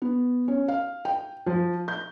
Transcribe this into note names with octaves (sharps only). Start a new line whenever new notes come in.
B3
C#4
F5
G5
F3
G6